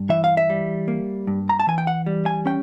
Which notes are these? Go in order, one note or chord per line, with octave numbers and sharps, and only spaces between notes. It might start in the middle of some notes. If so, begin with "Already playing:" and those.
Already playing: G2
E3 E5
F5
E5
G3
A#3
G2
A#5
A5
E3 G#5
G5
F#5
G3
G#5
C#4 G5